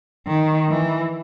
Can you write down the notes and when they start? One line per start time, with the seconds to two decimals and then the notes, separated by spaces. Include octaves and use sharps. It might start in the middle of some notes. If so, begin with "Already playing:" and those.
0.28 D#3
0.70 E3